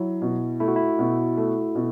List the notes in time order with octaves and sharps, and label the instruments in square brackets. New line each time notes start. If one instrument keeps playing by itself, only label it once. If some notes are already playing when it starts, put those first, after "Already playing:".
Already playing: [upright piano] F#3 [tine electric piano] E4
[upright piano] B2
[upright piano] A3 [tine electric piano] E4
[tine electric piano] F#4
E4
[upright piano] B2
A3
B2